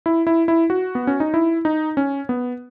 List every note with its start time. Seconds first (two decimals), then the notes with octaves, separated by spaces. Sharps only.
0.06 E4
0.27 E4
0.48 E4
0.70 F#4
0.95 B3
1.07 C#4
1.20 D#4
1.34 E4
1.65 D#4
1.97 C#4
2.29 B3